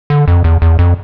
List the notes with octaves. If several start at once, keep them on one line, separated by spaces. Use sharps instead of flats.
D3
F2
E2
E2
F2